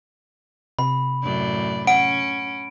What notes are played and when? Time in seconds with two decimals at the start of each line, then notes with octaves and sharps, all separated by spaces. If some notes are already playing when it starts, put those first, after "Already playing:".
0.79 C3 B5
1.23 F#2 A2 D5
1.87 C#4 F#5 D7